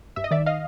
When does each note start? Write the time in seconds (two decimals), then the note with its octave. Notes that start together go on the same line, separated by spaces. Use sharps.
0.16 G2 E5
0.24 D#5
0.31 D#3 D5 E5
0.46 D#5 F5